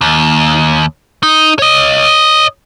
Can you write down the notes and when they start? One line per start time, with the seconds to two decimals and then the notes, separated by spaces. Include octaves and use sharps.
0.01 D#2
1.23 D#4
1.59 C#5 D#5